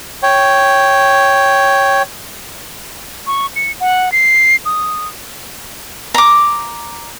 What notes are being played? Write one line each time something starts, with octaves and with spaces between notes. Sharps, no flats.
C#5 G5
C#6
C#7
F#5
C7
D#6
A#5 D6